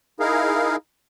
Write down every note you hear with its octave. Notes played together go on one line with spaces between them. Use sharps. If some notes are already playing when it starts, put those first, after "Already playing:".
D#4 E4 G#4 A#4 F5